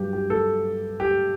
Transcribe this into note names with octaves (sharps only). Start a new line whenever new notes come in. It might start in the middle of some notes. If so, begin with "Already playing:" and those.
Already playing: G2 F#3 G4
G4
A4
G4